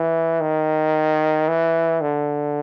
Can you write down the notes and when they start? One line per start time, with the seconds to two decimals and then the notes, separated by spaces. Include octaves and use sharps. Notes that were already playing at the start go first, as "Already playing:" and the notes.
Already playing: E3
0.40 D#3
1.48 E3
2.01 D3